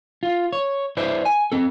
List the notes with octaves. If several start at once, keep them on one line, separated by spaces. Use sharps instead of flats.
F4
C#5
E4 B4 C5 D5
G#5
C4 A4